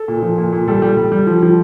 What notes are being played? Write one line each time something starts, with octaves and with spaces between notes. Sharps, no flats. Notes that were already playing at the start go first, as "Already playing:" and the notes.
Already playing: A4
A#2
F3
A#2
A#2
G3 A4
G3
G3
G3
F3
F3